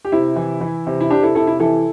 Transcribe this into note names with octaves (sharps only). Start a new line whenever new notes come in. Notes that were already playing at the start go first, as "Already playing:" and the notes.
G4
C3 E4
E3
E3
C3
E4
C3 D4 G4
E4 A4
C3 E4 A4
E4
E3 E4 A4